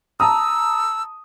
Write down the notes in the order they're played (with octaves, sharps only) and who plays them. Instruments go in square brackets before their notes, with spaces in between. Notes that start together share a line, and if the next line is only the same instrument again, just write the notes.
[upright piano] A5 A#5 D#6 [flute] E6